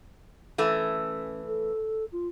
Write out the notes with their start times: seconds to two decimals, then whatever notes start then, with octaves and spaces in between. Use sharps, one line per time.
0.58 E3 A3 C#4
1.46 A4
2.12 F4